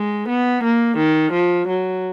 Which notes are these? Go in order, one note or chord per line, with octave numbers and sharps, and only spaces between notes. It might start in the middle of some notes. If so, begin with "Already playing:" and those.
Already playing: G#3
B3
A#3
D#3
F3
F#3